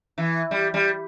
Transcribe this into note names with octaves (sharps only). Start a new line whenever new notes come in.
E3
G3
G3